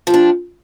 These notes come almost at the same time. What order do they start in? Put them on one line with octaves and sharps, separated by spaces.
F3 G4 D4